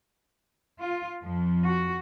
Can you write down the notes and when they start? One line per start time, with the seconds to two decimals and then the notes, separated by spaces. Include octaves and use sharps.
0.80 F4
1.23 F2 F3
1.66 F#4